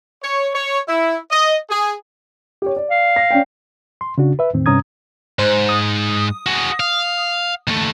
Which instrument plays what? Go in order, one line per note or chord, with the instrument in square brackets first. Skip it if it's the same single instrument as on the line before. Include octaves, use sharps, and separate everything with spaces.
[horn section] C#5
C#5
E4
D#5
G#4
[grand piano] G4 C#5
D5
[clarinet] F5
[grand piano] A#6
C#4 D5 G5
[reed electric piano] C6
C#3 D4 F#4
B4 E5
E2 A2 D#3 C4
G2 C3 C#4 A#5 D#6 G#6
[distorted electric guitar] G#2 [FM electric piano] C5
[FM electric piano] D#6
[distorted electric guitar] F#4 G#4
F5
D#2 A3